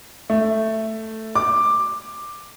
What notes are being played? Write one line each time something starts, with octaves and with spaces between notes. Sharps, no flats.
A3
D6